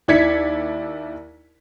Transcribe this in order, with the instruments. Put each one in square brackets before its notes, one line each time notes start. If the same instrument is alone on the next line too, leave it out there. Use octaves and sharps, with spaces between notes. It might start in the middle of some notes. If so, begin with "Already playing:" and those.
[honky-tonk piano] D#2 E4 D5 G#6 B6 C#7